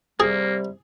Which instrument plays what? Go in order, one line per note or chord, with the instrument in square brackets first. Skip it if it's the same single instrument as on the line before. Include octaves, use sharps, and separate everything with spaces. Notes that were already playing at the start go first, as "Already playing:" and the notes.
[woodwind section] C3 G3 [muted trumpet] A#3 [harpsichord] G#4